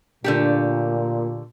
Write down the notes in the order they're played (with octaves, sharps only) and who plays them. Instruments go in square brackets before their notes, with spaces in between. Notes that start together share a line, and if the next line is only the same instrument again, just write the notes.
[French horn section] A#2 [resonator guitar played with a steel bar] D3 A3 G4